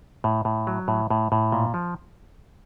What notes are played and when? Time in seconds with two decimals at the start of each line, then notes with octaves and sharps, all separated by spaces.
0.24 A2
0.45 A2
0.67 F#3
0.88 A2
1.10 A2
1.32 A2
1.52 A#2
1.74 F3